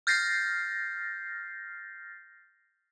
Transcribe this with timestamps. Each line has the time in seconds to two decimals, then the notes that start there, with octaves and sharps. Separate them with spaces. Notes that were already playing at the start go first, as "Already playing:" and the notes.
0.07 F6 G6 A6 A#6 C7